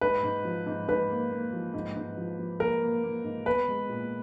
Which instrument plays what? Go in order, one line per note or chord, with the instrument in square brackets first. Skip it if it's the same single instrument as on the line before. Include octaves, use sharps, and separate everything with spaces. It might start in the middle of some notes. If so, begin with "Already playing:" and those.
[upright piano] G#2 [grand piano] B4
[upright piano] G#2
F3
G#2
[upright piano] G#2 [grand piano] B4
[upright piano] A#3
A#3
F3
G#2
G#2
F3
F3
[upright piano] A#3 [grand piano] A#4
[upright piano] A#3
A#3
G#2
[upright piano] B3 [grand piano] B4
[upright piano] G#3
A#2